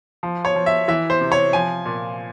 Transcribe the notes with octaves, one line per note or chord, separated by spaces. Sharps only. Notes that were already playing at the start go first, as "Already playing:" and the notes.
F3
C#5
F3
E5
E3 E5
C5
C3
C#5
F3 G#5
A#2